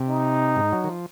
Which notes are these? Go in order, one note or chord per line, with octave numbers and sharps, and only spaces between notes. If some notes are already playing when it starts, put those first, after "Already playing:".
Already playing: C3
D#4
G#2
F#3
D#3
F3